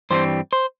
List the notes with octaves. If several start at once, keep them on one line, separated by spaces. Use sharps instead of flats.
G2 E3 G3 C4 C5
C5